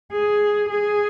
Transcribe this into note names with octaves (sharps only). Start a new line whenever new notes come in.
G#4
G#4